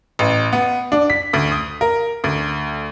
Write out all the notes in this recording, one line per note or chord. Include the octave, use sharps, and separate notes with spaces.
A1
B3
D4
B6
D2
D#6
A#4
D2